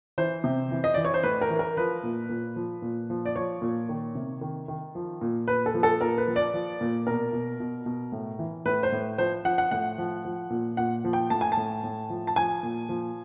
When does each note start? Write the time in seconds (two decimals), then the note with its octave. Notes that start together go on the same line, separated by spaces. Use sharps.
0.18 E3 C5
0.44 C3
0.71 E3
0.84 D#5
0.94 E3 D5
1.05 C#5
1.14 C5
1.23 A2 B4
1.41 A#4
1.50 E3
1.59 A#4
1.77 F3 B4
2.03 A#2
2.30 A#2
2.56 F3
2.82 A#2
3.10 F3
3.26 D5
3.36 F3 C#5
3.62 A#2
3.89 D#3
4.15 C3
4.41 D#3
4.68 D#3
4.95 F3
5.21 A#2
5.47 A#2 B4
5.66 A4
5.74 F3
5.83 A4
6.01 A#2 A#4
6.18 B4
6.27 F3
6.36 D5
6.54 F3
6.81 A#2
7.07 B2 A#4
7.33 B2
7.60 B2
7.86 B2
8.12 A2
8.39 E3
8.66 A2 B4
8.83 C5
8.92 A2
9.18 F3 C5
9.45 F3 F#5
9.58 F#5
9.71 A2 F#5
9.98 F3
10.25 F3
10.50 A#2
10.77 A#2 F#5
11.04 F3
11.13 G5
11.30 A2 A5
11.41 G#5
11.52 A5
11.57 A2
11.84 A2
12.10 F3
12.27 A5
12.36 F3 G#5
12.63 A#2
12.89 F3